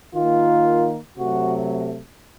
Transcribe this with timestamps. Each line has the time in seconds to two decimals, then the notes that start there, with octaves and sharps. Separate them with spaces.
0.15 D#3 A#3 F4
1.17 C3 F#3 A3 F#4